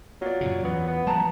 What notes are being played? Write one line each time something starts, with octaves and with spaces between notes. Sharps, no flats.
F#3 F4 D5
F#2 A#2 C#3
E2 B3
B3
F3 G3 G#3 A5 A#5